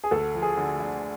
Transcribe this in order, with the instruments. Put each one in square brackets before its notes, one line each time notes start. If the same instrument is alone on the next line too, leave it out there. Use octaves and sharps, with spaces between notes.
[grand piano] G#4
[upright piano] D2 [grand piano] A4
[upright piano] F3
[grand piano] G#4
[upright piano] D3
D3